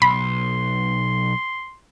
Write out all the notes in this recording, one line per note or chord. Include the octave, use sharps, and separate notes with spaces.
B1 B5 C6